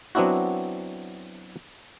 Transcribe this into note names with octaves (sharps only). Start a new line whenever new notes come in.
F#3 B3 C4 D4 E4 F#4